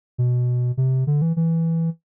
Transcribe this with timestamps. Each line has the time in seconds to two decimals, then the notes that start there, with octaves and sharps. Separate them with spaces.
0.18 B2
0.77 C3
1.07 D3
1.22 E3
1.37 E3